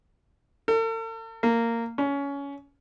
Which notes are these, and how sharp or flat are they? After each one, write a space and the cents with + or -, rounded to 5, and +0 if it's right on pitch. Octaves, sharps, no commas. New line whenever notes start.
A4 +45
A#3 -15
C#4 +20